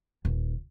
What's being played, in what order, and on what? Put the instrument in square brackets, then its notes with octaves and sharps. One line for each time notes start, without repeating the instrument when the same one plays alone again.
[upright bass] D#1